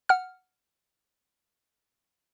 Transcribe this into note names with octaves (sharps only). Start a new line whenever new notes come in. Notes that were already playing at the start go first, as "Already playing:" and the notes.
F#5 F6